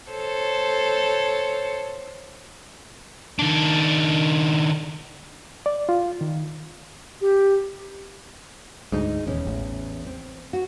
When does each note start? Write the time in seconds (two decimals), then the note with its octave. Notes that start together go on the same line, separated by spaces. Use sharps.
0.11 A4 C5 C#5
3.39 D#3 D4
5.66 D5
5.89 F4
6.21 D#3
7.21 G4
8.92 D2 G#2 G#3 D#4
9.27 D#1 E2 C#4
9.47 A1
10.07 C4
10.53 F#4